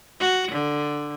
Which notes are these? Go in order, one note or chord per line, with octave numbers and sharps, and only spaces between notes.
F#4
D3